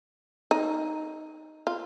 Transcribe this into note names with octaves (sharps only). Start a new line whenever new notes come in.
D#4
F4